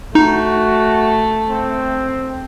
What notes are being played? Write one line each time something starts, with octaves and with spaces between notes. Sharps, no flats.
A3 D#4 F#4
C4